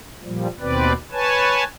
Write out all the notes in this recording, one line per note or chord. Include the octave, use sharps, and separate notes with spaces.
A#2 F3 G3
D#2 B2 C4 B4 D5
B4 C#5 G#5 A5